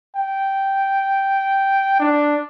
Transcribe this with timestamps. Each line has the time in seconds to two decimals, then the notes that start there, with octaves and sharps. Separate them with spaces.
0.16 G5
2.00 D4